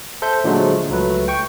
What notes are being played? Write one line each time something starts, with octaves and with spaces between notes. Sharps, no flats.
A4 C5 E5 G6
A#2 D3 F3 F#3 G#3 A3
C#2 F#3 A3 B4
G5 C#6